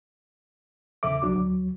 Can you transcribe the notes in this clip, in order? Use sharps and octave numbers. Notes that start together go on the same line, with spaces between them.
E2 C#3 A4 E5 D6
C2 D3 F#3 D4 F#4 D6
D2 F#3